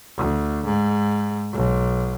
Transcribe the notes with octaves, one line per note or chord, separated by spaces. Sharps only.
D2
G#2
B1